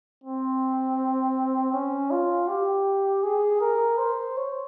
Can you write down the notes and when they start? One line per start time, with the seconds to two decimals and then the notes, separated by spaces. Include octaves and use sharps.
0.24 C4
1.73 C#4
2.11 F4
2.48 G4
3.23 G#4
3.61 A#4
3.98 C5
4.37 C#5